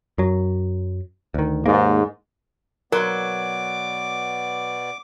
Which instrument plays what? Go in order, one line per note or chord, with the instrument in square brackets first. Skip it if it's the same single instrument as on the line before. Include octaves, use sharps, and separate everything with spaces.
[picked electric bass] F#2 F#3
D2 D#3
[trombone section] D#2 G#2 [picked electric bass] A#3
[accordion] B2 B3 D5 [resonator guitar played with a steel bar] F#3 [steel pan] A#4 [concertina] D6